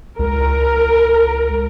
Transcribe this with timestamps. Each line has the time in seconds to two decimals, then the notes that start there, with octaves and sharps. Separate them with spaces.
0.19 C#2 A#4